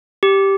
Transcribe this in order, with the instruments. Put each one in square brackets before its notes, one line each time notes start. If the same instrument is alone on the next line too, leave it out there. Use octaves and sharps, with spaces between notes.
[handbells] G4